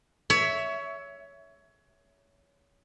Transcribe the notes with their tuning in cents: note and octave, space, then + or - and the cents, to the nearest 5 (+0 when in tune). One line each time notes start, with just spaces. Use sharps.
C#5 +20 E5 +0